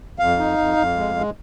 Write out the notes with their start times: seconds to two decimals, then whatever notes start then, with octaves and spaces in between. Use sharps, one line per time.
0.19 F2 F5
0.39 D#4
0.58 F2
0.77 F2
0.96 G#3
1.15 G#3